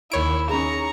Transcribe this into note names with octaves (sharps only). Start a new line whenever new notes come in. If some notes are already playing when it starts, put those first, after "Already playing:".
D#2 E4 C#5 D7
C#4 D#4 G#4 A#5 C#6